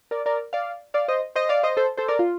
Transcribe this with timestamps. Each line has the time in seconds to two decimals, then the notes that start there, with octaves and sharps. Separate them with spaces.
0.11 A#4 D5
0.26 A#4 D5
0.53 D5 F5
0.94 D5 F5
1.08 C5 D#5
1.36 C5 D#5
1.49 D5 F5
1.63 C5 D#5
1.77 A4 C5
1.97 A4 C5
2.08 A#4 D5
2.19 F4